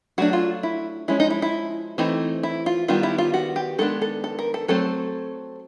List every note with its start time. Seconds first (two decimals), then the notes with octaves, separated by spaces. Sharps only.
0.18 F#3 A3 D4 F#4
0.33 F4
0.63 E4
1.08 F3 G#3 C#4 E4
1.20 D#4
1.30 E4
1.42 E4
1.98 E3 A3 C4 D#4
2.43 E4
2.66 F4
2.88 D#3 G3 B3 F4
3.03 E4
3.18 F4
3.34 F#4
3.56 G4
3.78 D#3 G#3 B3 D4 A4
4.02 A4
4.24 A4
4.39 A#4
4.54 A4
4.68 F#3 A3 C4 A4